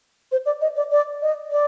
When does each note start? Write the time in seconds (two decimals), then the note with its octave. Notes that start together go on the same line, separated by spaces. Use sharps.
0.32 C5
0.46 D5
0.61 D#5
0.76 D5
0.92 D5
1.22 D#5
1.52 D5